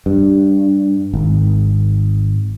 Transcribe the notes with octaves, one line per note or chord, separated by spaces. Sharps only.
G2
G#1